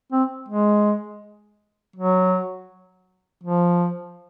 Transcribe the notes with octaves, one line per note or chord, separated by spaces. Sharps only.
C4
G#3
F#3
F3